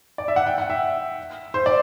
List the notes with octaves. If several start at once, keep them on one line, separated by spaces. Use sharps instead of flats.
D5
E5
F#5
G5
F#5
E5
C5
D5